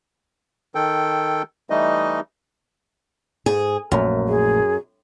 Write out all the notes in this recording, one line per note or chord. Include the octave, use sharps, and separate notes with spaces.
D#3 A4 G5
E3 G3 A3 D#4 D#5
G#2 G#4
A#1 F#2 A#2 A3
G#4